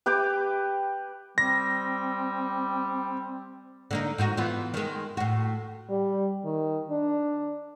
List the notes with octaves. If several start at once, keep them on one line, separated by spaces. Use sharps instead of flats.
G4 B4 G5 D6
G3 C4 A#6
D3 A#3 D#4
G#2 D#4 F#4
E3 B3 F4
D#3 G#3
A2 F#4
G3
D#3
D4